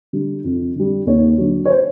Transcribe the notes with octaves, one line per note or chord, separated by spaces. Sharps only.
D3 G3
F2
D3 G3
D#2 C#5
D3 F#3
C#5
C5